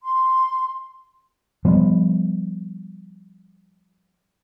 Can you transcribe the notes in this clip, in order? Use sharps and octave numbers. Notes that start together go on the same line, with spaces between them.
C6
F3 G3 B3